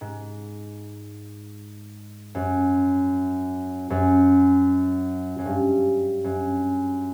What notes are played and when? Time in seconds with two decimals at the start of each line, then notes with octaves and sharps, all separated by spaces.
0.01 G#2
2.35 F#2
3.90 F#2
5.38 F#2
5.46 G2
6.24 F#2